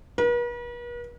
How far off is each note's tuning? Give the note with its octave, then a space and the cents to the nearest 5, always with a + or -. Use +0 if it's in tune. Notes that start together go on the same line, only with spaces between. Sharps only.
B4 -45